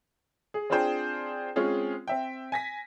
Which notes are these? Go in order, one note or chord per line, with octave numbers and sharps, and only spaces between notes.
G#4
C4 D4 F4 G#4 C5 G5
G#3 C4 C#4 F4 G#4
C4 E5 G5
G#5 A#6 B6